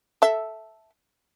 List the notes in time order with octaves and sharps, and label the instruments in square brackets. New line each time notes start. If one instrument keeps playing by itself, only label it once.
[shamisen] A4 E5